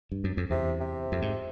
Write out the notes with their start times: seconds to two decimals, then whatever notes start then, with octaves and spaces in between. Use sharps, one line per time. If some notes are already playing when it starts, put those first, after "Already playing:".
0.12 G2
0.24 F#2
0.37 F2
0.50 E2 C3
0.81 C3
1.12 F2
1.22 G#2